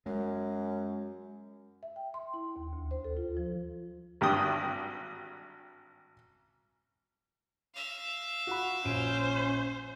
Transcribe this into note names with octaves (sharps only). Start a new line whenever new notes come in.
F#2 G#3
E5
G5
C6
E4
D#2
D2
C5
A4
F4
F3
G#1 G2 G4 G5 D#6
E5 F5
F#4 B5
A#1 C#4 C5 D7 D#7